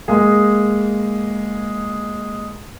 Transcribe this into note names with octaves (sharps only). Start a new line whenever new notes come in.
G#3 A#3 G#4